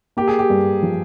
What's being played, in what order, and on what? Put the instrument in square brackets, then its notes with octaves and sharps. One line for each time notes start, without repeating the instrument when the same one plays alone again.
[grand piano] A#3 [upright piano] G4
[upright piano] G#4
G4
[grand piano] G2
F3